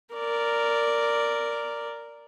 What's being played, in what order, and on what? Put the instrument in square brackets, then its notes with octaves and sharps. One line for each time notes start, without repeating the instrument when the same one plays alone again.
[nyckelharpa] A#4 D5